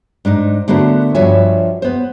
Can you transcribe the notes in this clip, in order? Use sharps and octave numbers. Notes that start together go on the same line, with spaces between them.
G#2 D4 D#4
D3 A3 B3 F#4 A#4 C5
G2 F3 F#4 C#5 E5 G#5
B3 C5